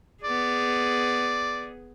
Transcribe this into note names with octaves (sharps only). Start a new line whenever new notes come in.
B3 G#4 D5